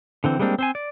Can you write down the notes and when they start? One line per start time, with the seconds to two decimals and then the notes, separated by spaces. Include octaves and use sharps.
0.24 D3 E3 C4
0.39 G3 G#3 A#3 C4 D4
0.59 C4 C5 G#5
0.75 D5